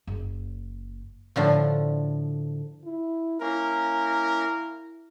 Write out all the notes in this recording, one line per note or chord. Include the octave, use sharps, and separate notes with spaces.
F#1
A2 D3 F3
E4
A#3 C#4 E4 A#4